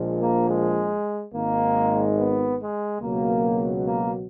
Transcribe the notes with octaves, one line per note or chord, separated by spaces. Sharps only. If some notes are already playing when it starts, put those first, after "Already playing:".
Already playing: A#1 A#2 F3 G#3
A#3
G#3
G#1 G#2 D#3 G#3 A#3
B3
G#3
C#2 B2 F#3 A#3
A#3